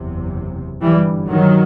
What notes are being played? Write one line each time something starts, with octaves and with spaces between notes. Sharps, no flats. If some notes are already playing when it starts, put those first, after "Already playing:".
Already playing: F#1 E2 C3
G1 G2 E3 G3
D#3 F#3